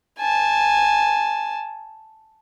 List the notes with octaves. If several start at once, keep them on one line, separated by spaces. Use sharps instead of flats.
G#5 A5